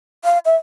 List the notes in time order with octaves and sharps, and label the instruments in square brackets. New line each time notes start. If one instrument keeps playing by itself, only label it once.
[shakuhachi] F5
E5